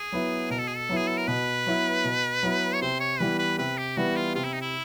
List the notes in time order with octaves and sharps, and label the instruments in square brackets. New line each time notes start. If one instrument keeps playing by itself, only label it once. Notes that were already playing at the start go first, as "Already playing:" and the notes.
Already playing: [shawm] G#4
[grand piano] F#3 B3 E4
[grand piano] B2 [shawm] A#4
[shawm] A4
G#4
A4
[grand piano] F#3 B3 E4
[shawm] G#4
A4
A#4
[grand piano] B2 [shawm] B4
[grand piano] F#3 B3 E4
B2
F#3 B3 E4
[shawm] C#5
[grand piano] C3 [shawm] C5
[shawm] C#5
[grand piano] E3 G3 B3 E4 [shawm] B4
[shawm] B4
[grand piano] C3 [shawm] B4
[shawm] G4
[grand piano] E3 G3 B3 E4 [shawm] F#4
[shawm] F4
[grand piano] C3 [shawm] F4
[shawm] E4
D#4
E4